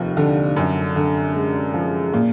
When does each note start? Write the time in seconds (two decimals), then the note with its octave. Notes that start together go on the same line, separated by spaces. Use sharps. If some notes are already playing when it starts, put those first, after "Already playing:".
Already playing: F1 D#2 F3
0.17 D3
0.56 F#2
0.96 D3
1.36 G#3
1.74 F3
2.13 A#2